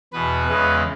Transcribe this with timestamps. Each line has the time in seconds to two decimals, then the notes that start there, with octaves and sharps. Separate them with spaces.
0.13 E2 B2 B3 B4
0.48 E2 C#3 E3 G#3 B3